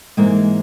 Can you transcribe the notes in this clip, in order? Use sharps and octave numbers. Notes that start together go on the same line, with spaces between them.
G#2 E3 G#3 A#3